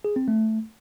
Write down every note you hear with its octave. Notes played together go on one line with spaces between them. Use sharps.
G#4
C4
A3